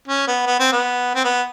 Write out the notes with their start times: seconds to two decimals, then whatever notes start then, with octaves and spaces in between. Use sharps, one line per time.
0.08 C#4
0.27 B3
0.47 B3
0.60 C4
0.72 B3
1.15 C4
1.24 B3